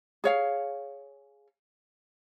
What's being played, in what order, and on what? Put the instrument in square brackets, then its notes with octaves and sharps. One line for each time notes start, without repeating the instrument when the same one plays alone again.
[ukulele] G#4 C#5 F5